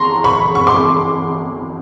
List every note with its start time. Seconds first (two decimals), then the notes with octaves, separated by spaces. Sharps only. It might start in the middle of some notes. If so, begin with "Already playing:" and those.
Already playing: A#5 C6 C#6
0.24 B5 C#6
0.55 C#6
0.67 C6 D6